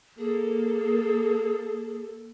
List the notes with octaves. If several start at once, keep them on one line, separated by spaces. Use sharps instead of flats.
A#3 G#4 A4